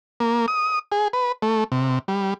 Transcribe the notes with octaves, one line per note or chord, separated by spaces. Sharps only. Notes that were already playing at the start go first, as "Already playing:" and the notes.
A#3
D#6
G#4
B4
A3
C3
G3